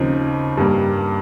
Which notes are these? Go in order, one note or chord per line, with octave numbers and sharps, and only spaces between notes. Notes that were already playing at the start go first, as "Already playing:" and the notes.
Already playing: D#2 C#3 F3 C4 D#4
G2 G3 A#3